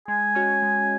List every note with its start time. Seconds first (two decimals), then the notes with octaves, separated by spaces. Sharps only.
0.08 G#3 G#5
0.35 C#4 F#4 C#5
0.62 G#3